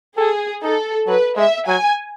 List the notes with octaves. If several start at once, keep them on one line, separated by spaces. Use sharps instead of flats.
G#4 A4
D#4 A4
F#3 B4
G#3 E5
F#3 G#5